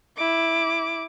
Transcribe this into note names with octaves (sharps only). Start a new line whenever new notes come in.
E4 D6